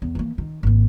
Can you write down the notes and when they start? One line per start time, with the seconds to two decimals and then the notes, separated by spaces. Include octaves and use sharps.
0.02 E2
0.15 E3 A#3
0.38 D#3
0.63 G#1 A#3